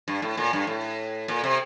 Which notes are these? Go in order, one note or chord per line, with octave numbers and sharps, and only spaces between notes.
G2
A2
A#2
G2
A2
A#2
C3